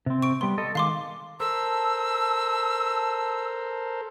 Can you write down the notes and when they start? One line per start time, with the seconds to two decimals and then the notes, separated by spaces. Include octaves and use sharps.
0.06 C3 C4
0.22 C#6 D7
0.41 G3 B3 C6
0.58 A4 D#5
0.75 D#3 G#3 F5 C6 D6
1.40 A4 A#4 C5 A5 E6